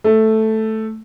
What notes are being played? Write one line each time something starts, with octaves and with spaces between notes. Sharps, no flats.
A3